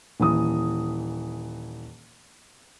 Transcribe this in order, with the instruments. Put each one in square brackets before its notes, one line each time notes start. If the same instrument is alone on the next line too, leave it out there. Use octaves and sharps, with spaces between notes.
[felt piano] D#1 E3 D#6